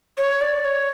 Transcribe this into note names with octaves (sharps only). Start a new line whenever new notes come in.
C#5
D5
C#5